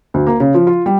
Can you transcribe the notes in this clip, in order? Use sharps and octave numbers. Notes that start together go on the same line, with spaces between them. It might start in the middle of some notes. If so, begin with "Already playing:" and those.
D2
A#3
C#3
F3
F4
G3